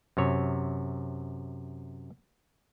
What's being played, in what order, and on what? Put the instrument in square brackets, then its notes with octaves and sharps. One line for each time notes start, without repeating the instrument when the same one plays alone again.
[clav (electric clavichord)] F#2 C3 C#5